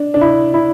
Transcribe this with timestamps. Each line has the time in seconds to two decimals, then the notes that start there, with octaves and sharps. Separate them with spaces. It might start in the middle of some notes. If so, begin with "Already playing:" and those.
Already playing: D4
0.14 D4
0.21 E4
0.54 E4